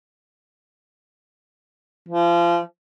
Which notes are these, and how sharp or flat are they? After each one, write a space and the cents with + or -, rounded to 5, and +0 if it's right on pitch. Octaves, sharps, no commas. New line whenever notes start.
F3 -30